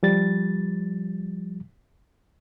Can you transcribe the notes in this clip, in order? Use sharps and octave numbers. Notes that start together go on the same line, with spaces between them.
F3 G3 A6